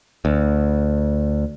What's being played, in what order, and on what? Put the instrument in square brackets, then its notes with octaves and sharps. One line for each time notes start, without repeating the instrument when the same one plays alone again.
[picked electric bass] D2